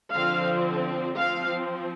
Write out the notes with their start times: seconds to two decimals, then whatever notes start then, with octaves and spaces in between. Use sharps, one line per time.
0.14 D3 F3 C4 F5
1.17 F3 C4 F5